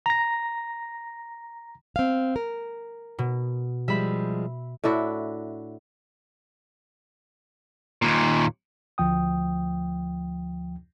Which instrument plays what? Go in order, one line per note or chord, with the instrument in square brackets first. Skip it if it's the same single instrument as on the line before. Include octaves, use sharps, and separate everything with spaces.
[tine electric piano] A#5 A#6
[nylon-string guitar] C4 F5
A#4
[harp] B2
[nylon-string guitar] F3 G3 G#3 [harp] E5 B5
[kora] A2 D4 E4 F#4
[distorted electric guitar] D#2 A#2
[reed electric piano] D2 F3 G5 D#6